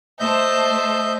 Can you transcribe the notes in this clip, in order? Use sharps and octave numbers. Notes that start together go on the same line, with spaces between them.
A3 C5 D#5 E5 A5 G6